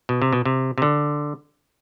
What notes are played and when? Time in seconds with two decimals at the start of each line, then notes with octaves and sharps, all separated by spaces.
0.09 B2
0.22 C3
0.33 B2
0.45 C3
0.78 C3
0.82 D3